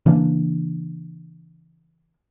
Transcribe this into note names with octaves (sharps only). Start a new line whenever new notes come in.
C#3 E3 A#3 D4